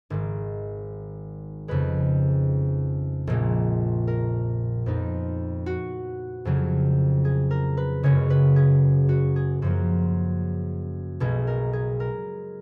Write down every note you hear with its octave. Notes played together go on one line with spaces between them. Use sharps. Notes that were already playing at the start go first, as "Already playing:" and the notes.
G#1 G#2 D#3
F2 C#3 G#3 B4
A#1 A#2 G#3
A#4
F2 F3 B3 D#4
F#4
F2 C#3 F#3
G#4
A#4
B4
F#1 F#2 C#3 G#3 C#5
B4
G#4
F#4
G#4
F#2 F3 A#3 F#4
B1 B2 G#3 G#4
A#4
G#4
A#4